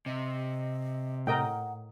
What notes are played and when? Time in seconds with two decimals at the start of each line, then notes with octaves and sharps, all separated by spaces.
0.06 C3 D#5
1.27 A2 A#4 D#5 F#5 G5